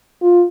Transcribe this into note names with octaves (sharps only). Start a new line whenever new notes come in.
F4